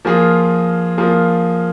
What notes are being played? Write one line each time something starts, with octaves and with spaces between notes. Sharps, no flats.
F3 A#3 F4 G#4
F3 A#3 F4 G#4